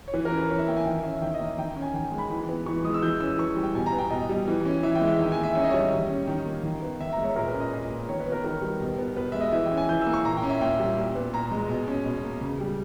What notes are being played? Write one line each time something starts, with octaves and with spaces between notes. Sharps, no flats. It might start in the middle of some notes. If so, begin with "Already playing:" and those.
C#5
E3 B4
A#4
C#4
B4
E3 C#5
E5
A#3 G5
G#5
D#3 G5
C#4 E5
D#3 G5
D#5
A#3
D#3 G5
G5
C#4
G#5
D#3 G5
G#3
B5
E3
B3
E3 C#6
G#3 D#6
E6
E3 G6
C#4 E6
E3 C#6
G3
G5
B2 G#5
A#5
B3
G5
B2 D#5
G3
E3
C#4
E3 E5
G5
G#3
E5
D#3 E5
G#5
A#3
E5
C#4 C#5
D#5
G3 C#5
D#3
C#4
D#3
A#3
D#3
B3
D#3 E5
A#5
G#3
C#5
A#2 A#4
B4
C#4
D#5
A#2
A#3
D#3 C#5
B4
B3
A#4
D#3 A#4
G3
B2
B3
B2 B4
G#3 E5
D#5
E3 E5
G5
C#4
G#5
E3 G6
A#3 E6
C#6
A#2 A#5
G5
C#4
E5
A#2 G5
G3
A#2
B3
A#2 A#5
G#3
B2
C#4
B2
A#3
C#3
G3